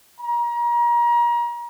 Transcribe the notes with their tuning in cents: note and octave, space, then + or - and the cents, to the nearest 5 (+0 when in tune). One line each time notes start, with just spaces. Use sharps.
A#5 +35